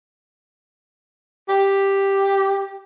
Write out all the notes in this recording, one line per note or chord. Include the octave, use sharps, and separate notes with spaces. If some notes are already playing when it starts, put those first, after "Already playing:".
G4